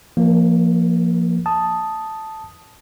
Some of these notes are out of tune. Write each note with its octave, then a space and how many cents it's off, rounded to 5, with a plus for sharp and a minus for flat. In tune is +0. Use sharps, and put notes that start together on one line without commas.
F3 -15 A#3 +0 A#4 +45
A5 +0 D#6 +0